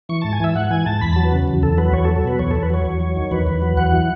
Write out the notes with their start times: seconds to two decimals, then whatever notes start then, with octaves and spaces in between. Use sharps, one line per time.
0.09 E3 C#6
0.21 G#2 A5
0.33 G#5
0.40 E3 E5
0.55 G#2 F#5
0.71 E3 G#5
0.86 G#2 A5
1.01 E2 B5
1.13 F#3 A5
1.25 B4
1.32 C#3
1.48 E2
1.63 E2 A4
1.78 F#3 B4
1.93 E2 C#5
2.05 A4
2.09 F#3
2.16 A4
2.24 B2 B4
2.39 E2 C#5
2.51 E2 A4
2.63 B4
2.70 F#3 C#5
2.85 E2
3.01 F#3
3.16 D#3
3.31 E2 B4
3.47 E2
3.62 F#3
3.77 E2 F#5
3.92 E3